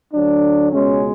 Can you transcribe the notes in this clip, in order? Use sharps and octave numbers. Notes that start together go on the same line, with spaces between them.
D2 D3 F#3 D4
C#2 B2 G#3 C#4